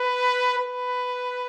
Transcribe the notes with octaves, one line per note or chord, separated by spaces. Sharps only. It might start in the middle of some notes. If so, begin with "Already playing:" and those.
Already playing: B4
B4